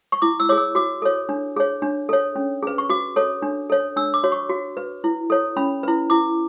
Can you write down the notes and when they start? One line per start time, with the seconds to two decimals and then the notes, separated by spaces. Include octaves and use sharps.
0.12 C#6
0.22 E4 D6
0.40 E6
0.49 G#4 C#5 D6
0.58 E6
0.75 F#4 D6
1.02 A4 C#5
1.29 D4
1.56 G#4 C#5
1.82 D4
2.09 A4 C#5
2.36 C#4
2.63 G#4 B4
2.78 C#6
2.89 F#4 D6
3.16 A4 C#5
3.42 D4
3.70 A4 C#5
3.97 D4 E6
4.14 D6
4.24 F#4 C#5
4.32 C#6
4.50 F#4
4.77 B4
5.04 E4
5.30 A4 C#5
5.57 C#4 B5
5.83 E4 B4
6.10 E4 D6